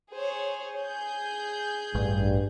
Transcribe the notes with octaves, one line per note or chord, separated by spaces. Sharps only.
G#4 C5 C#5
G#4 G6
A1 G2